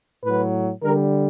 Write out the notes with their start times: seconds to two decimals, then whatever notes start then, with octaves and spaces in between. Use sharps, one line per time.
0.24 A2 F#3 B4
0.84 D3 G3 A#4